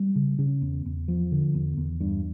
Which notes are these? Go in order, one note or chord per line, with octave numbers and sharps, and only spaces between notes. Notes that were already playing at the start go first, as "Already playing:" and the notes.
Already playing: G3
C#3
C#3
E2
E2
F3
D3
E2
E2
G2